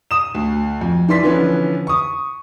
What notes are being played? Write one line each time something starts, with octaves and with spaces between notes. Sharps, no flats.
D#6 E7
D2
F2
E3 D5 C6 B6
D3 E3 F3 B3 C#4
C#6 D#6